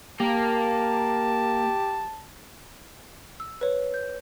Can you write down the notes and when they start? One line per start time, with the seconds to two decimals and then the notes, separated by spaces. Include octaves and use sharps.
0.20 A#3 G4 A5
3.40 E6
3.61 B4 C#5
3.94 G6